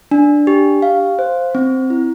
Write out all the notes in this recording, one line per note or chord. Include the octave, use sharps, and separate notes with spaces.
D4
G4
F5
C5
C4
E4